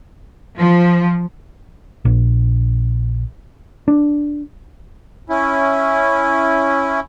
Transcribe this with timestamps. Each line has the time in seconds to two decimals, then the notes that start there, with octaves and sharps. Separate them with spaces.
0.56 F3
2.05 A#1
3.88 D4
5.29 C#4 E4